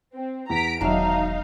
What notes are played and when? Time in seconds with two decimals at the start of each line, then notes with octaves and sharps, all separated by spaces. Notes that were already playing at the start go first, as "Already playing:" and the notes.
0.15 C4
0.50 E2 A#5 B6 D7
0.81 E1 D#3 F#3 D4 D#4 E5 F5 A#5